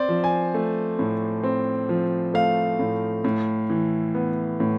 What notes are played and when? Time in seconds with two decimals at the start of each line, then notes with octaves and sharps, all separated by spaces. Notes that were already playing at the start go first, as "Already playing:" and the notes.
Already playing: C4 C5 D5
0.09 F3
0.24 G#5
0.54 A3
0.99 A2
1.43 C4
1.89 F3
2.34 A3 F5
2.79 A2
3.24 A2
3.70 E3
4.14 B3
4.60 A2